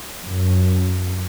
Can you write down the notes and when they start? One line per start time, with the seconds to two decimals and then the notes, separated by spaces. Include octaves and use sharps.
0.23 F#2